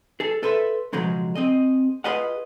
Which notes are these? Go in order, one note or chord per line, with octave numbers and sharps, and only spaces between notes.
G#4 A4
A4 B4 C5 E5
B1 C#3 F3 F#3 G#3
C4 G#4 D#5
F4 G#4 B4 D#5 F5 F#5